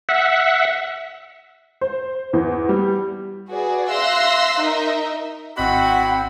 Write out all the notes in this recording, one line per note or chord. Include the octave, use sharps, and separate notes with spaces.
E5 F#5
C5
E2
G3
F#4 G#4 B4 D5
E5 F5 C6 E6 F#6 A#6
D#4 A#4 D#5 E5
G#1 C4 E4 F#4 D#5 F#5 B5 F#6